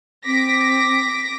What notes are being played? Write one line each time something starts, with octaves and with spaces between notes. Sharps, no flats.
C4 D6 A#6 B6